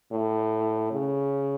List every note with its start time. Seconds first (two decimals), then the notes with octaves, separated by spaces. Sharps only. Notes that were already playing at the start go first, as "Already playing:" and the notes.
0.12 A2
0.92 C#3